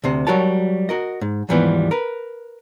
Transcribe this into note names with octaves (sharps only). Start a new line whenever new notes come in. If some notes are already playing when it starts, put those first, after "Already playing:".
D2 C3 C5
F#3 G3 F#4 A#4 C#5 A5
F#4 A#4 D#5
G#2
D#2 G#2 E3 F3 G3 B3
A#4 B4